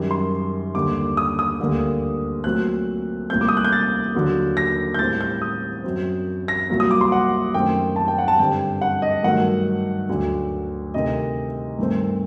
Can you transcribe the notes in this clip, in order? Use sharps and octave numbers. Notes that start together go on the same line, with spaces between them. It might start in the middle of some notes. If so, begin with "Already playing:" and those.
Already playing: F#2 D#3 G3
C6
D#2 D3 G3 D6
D#6
D#6
D2 D3 G3 A#3
A#2 F#3 A3 C4 F#6
C2 A#2 A3 C4 G6
D6
D#6
F#6
G6
A6
D#2 D3 F#3 A#3
A#6
G6
A2 G3 C4 A6
G6
D#6
F#2 F#3 C4
A#6
C2 A#2 F#3 A#3
D#6
D6
C6
F#5
F#2 D#3 A3 C4 G5
A5
G5
F#5
A5
G2 D3 G3 C4 G5
F#5
D#5
G2 D#3 F#3 A3 F#5
D2 D3 F#3
D2 C3 D#3 D#5
G2 D#3 A3 C4